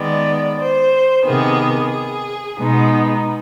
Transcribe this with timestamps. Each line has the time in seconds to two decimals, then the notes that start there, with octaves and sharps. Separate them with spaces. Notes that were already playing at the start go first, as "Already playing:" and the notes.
Already playing: D#3 G#3 B3 D5
0.59 C5
1.24 C3 D#3 B3 G#4
1.91 G#4
2.58 B2 G#3 B3 D#4